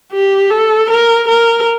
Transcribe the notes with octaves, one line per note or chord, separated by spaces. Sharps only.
G4
A4
A#4
A#4